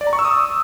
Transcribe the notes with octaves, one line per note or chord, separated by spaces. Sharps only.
D5
A#5
C#6
E6
D#6